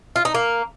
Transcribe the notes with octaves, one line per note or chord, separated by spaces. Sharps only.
F4
D#4
A#3